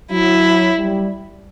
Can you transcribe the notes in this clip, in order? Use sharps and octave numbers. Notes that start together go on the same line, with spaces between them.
F#3 E4
G3